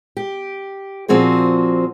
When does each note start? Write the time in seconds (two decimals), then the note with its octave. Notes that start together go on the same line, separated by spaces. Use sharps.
0.17 G4
1.08 A#2 F3 C4 F#4 G#4 C5